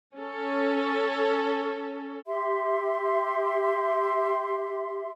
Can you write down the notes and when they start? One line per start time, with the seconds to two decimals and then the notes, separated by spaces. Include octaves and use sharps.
0.15 C#4 A4
2.25 G4 E5 C6